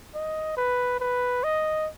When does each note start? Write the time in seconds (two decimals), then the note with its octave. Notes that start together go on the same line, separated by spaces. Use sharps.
0.15 D#5
0.57 B4
1.00 B4
1.44 D#5